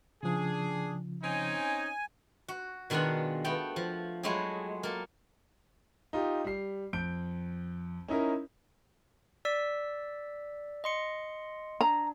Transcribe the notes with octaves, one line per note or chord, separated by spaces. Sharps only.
C#3 F3 D4 G#4
C4 C#4 D#4 G#5
F#4
B2 D#3 G#3 D4 F4 F#5
A3 B3 G5
F3
F#3 G#3 A3 E4 G4 G#4
A#3 A4
D#4 F4 G4
G3 C7
F2 G6 D7
C#4 D#4 E4 A#4
D5 E6 B6
D#5 C6 C#7
D4 A#5